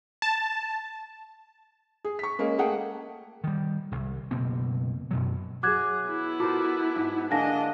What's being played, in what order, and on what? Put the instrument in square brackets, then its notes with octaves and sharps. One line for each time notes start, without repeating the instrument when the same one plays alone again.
[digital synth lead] A5
[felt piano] G#4
C#6 B6
G#3 A#3 C#4
A3 A#3 G#4 F#5 G5
[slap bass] D#3 G3
E1 C2
F#1 B2 A#3 C4
F#2 B2 F#3
[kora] F#3 E5 [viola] G#4 [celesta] D6 F#6 G#6
[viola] B3 E4
[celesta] F4 F#4 D6 [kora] A4 A#4 C5
[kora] G#2
[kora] D3 G#3 A#3 [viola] D4 D#5 [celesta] G#5 A5 A#6